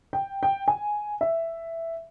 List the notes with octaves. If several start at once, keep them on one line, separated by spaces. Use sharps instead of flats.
G5
G5
G#5
E5